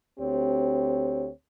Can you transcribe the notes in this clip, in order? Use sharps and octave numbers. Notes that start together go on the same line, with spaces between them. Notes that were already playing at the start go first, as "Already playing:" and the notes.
D2 C4 G4 C#5